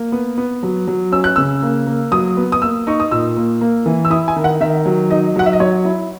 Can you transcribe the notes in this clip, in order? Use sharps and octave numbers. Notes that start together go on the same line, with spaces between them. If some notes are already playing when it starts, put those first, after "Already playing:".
Already playing: A#3
B3
B3
F#3
F#3
C#4 E6
F#6
C#3 E6
A#3
A#3
F#3 D#6
B3
D#6
A#3 E6
D#4 C#6
D#6
A#2 E6
A#3
A#3
E3
E6
E4 D#6
G#5
D#3
F#5
D#3 E5
F#3
D#4 D#5
F#3 F#5
E5
D#5
F#3 C#5
E4